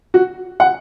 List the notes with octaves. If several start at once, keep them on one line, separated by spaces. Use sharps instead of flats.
F#4
F#5